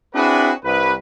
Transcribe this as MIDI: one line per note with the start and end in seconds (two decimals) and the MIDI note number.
0.15 0.52 60
0.15 0.52 62
0.15 0.52 64
0.15 0.52 66
0.15 0.52 68
0.15 0.52 71
0.64 0.93 36
0.64 0.93 71